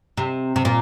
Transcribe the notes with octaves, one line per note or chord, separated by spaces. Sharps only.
C3
C3
A#2